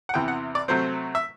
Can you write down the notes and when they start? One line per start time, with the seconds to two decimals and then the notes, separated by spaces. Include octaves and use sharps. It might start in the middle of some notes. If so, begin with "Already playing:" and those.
0.09 F#5
0.14 E2 C3 E3 G5
0.28 F#5
0.55 D5
0.68 C3 F#3 A3 C4 C5
1.15 E5